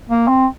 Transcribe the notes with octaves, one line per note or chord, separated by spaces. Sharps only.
A#3
C4